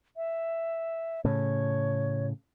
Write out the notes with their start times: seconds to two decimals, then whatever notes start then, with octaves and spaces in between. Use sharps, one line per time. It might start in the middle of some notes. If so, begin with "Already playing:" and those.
0.17 E5
1.25 A2 C#3 C#5